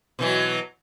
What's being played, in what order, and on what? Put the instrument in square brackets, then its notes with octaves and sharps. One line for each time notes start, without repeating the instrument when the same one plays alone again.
[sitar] B2 E3 F#3